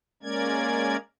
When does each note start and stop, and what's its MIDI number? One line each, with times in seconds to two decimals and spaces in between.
0.23 0.97 56
0.23 0.97 58
0.23 0.97 61
0.23 0.97 70
0.23 0.97 74
0.23 0.97 92